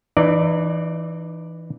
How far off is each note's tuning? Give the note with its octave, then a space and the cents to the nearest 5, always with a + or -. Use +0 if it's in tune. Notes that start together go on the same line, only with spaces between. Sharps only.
E3 +0 D#4 -35 D5 +0